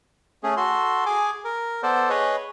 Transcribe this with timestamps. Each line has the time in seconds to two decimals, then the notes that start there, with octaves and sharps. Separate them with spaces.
0.43 A3 C#4 G#4
0.57 F#4 A4 C6
1.06 G#4 G#5 D6
1.45 A#4
1.83 B3 A4 C5 D5
2.10 G#4 B4 C#5 D#5